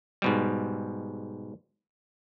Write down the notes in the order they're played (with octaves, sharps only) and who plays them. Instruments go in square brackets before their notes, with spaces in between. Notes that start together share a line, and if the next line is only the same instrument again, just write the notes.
[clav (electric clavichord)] G#2 B2 G3